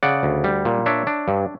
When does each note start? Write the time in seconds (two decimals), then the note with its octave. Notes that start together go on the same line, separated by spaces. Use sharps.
0.03 C#3 D5 F#5
0.23 D2
0.44 G3
0.65 A#2
0.86 D4 C#5 E5
1.07 D4
1.28 G2